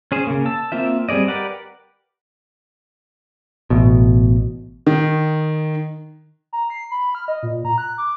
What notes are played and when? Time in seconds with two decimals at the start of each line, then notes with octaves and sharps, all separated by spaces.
0.12 C#4 G#4 C5
0.27 C#3 A#3
0.46 A5 E6
0.72 A#3 C4 F4 E5
1.09 G3 C4 G#4 D5 D#5
1.28 G4 A#4 B4 D5 F#5
3.70 A1 B2
4.87 D#3
6.53 A#5
6.70 C7
6.91 B5
7.15 F6
7.28 D#5
7.43 A#2
7.65 A#5
7.78 F#6
7.98 D6